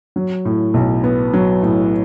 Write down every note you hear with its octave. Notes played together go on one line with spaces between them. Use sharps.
F#3
A2
B1
B3
F#3
A2